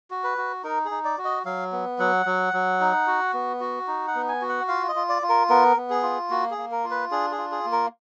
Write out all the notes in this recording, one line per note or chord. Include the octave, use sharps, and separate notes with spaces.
F#4
B4
F#4
D#4 A#4
G#4
D#4
D5
F#4
D#5
F#3 F5
B3
F#3 F#5
F#3
F#3
D#4
F#4
B3
F#4
D#4
F#5
B3
G#5
F#4
F#5
F4 F5
D#5
F4
D5
F4
A#4
B3 A#4
B3
G#4
F4
A#3 F#4
G#4
A#3
A#4
F4
B4
D4 G#4
G#4
F4
G#4
A#3
A#4